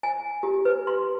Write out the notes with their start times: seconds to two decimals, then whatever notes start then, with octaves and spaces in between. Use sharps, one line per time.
0.03 G#5
0.43 G4
0.65 B4
0.87 C6